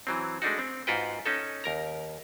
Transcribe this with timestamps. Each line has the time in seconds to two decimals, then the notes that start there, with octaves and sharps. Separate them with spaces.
0.07 E3 F#3 C4
0.42 G#3 A3 D4 D#4 F#4
0.59 C4
0.87 G#2 F4 F#4 B4 G5
1.26 C#4 D#4 A4
1.64 D#2 A#4 A#5